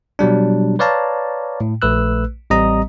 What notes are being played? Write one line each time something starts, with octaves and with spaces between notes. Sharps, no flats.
B2 F#3 G3 D4
B4 C#5 D5 F5 A5 A#5
A2
A#1 A3 B4 E6 F#6
A1 G3 C4 D#5 A#5 D#6